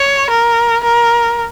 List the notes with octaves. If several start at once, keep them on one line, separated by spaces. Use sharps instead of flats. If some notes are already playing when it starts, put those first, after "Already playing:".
Already playing: C#5
A#4
A#4